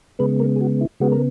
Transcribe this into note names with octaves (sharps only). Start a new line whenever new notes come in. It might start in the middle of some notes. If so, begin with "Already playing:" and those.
C#3 G#3 B3 B4
A#3 A#4
G#4
F#4
E4
C#3 G#3 B3 F#4
A#4